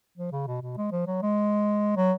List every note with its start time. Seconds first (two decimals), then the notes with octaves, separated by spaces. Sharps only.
0.17 F3
0.32 C#3
0.47 B2
0.62 B2
0.77 G#3
0.92 F3
1.07 F#3
1.22 G#3
1.97 F#3